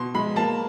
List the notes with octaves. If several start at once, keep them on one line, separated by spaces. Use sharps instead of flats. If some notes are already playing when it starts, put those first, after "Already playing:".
Already playing: B2 C6
G#3 B5
A#3 A5